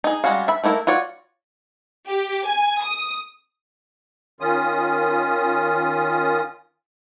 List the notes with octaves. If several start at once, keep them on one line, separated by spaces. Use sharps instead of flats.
D#4 G#4
G3 G#3 C#4 F#4 F5
E5 B5
A3 A#3 E4 F#4 A#4
F4 F#4 C#5 D5
G4
G#5
D#6
D#3 C#4 F4 D#6